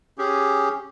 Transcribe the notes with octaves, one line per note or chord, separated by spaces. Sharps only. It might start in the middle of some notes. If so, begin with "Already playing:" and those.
C#4 G4 G#4